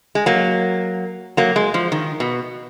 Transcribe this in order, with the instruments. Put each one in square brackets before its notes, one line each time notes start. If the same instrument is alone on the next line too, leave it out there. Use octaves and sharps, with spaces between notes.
[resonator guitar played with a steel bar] G#3
F#3 A#3
F#3 A#3
G#3
F3
D#3
B2